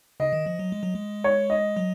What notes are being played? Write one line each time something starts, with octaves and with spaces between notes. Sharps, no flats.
C#3 D#5
D#3
F3
F#3
G#3
F#3
G#3
C#5
D#5
F#3